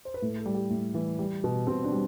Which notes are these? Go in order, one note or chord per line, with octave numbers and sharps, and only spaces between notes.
C5
B4
A2 A4
A4
G3
G4
A2
E3
G3
B2
B2 C4
D4
G3